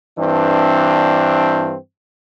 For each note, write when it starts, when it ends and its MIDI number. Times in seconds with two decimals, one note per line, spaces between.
0.18 1.75 43
0.18 1.75 52
0.18 1.75 60
0.18 1.75 62